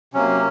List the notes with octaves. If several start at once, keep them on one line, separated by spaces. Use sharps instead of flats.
C3 F#3 A#3 C#4